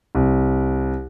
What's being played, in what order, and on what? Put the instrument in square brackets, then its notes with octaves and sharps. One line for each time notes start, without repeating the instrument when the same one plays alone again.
[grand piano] C2